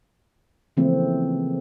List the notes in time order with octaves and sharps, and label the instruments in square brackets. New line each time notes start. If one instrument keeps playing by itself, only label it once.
[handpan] C#3 E3 F3 A3 A#3 C4